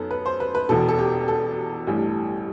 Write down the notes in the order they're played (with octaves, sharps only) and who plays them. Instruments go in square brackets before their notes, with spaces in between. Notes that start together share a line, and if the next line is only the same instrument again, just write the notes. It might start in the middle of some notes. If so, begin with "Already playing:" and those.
Already playing: [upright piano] F#2 B3 D#4 [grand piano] A4
[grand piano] B4
C5
B4
B4
[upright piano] E1 E2 B2 [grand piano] A4
[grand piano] A4
G4
A4
[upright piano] A1 G2 E3 G3